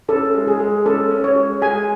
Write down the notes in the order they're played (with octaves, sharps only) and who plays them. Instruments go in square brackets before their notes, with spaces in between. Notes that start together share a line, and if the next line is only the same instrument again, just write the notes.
[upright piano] C#4 [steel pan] A4
[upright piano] G#3
[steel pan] G#4
[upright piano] G#3
[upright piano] C#4 [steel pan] A4
[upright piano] C#4
[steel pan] C#5
[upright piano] G#3
[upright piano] G#3 [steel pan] G#5